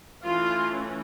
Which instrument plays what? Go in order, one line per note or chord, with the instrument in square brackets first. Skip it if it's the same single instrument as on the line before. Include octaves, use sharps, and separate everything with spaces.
[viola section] E3 A3 C#4 F4